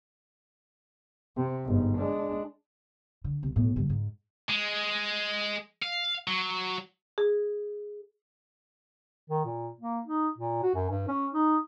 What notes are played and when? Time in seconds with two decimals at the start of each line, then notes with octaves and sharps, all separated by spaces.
1.36 C3
1.65 G1 G#2
1.97 G#3 D4
3.24 D3
3.43 C2
3.56 B1 A2
3.76 G2 D3
3.89 G#2
4.49 G#3
5.82 F5
6.28 F#3
7.18 G#4
9.30 D#3
9.45 A#2
9.81 A#3
10.05 D#4
10.38 A#2
10.63 F#4
10.75 F#2
10.90 G2
11.08 C#4
11.33 D#4